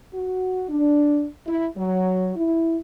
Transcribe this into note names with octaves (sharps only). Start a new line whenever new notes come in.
F#4
D4
E4
F#3
E4